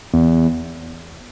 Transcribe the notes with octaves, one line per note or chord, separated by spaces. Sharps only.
E2